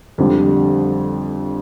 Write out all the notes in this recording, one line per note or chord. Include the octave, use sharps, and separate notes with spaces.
F2 D3 G3